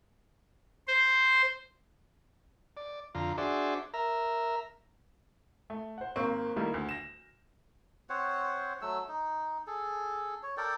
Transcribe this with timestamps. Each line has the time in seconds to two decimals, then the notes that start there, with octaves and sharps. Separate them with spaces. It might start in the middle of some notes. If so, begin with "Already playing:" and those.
0.87 C5
2.77 D5
3.15 F2 D3 F4 A#5
3.38 D4 F#4 G#4 C5 D5 E5
3.94 A#4 E5 A#5
5.70 A3
5.98 C5 F#5
6.16 G#1 A#3 C4 C#6
6.56 D#3 G3 A3 A#3 E4
6.74 D2
6.89 A#6 E7
8.10 C4 C5 C#5 F#5
8.82 F#3 A3 E6
9.08 D#4
9.67 G#4 A4
10.43 C#5
10.57 A4 A#4 D5 G5